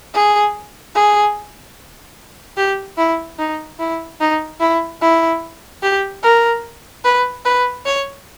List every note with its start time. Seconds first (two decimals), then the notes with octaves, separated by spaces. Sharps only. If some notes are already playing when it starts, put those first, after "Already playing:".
0.14 G#4
0.95 G#4
2.57 G4
2.98 E4
3.39 D#4
3.79 E4
4.21 D#4
4.60 E4
5.01 E4
5.83 G4
6.23 A#4
7.04 B4
7.45 B4
7.86 C#5